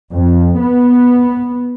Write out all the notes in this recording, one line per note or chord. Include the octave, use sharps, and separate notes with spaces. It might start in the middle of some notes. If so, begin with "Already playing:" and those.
F2
B3